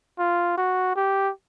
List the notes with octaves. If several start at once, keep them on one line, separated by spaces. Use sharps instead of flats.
F4
F#4
G4